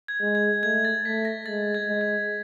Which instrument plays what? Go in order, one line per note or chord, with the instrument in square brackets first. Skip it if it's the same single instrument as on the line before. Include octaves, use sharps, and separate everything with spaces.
[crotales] G#6
[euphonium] G#3
[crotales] G#6
[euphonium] A3 [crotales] G#6
[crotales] A6
[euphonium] A3 [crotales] B6
[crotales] A#6
[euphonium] G#3 [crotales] A6
[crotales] G#6
[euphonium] G#3
[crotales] G#6